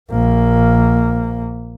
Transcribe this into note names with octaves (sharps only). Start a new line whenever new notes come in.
A#1 A#3